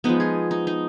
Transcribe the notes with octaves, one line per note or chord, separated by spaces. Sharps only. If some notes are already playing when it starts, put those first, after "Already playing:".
F3 G#3 B3 D#4
G#4
D#4
D#4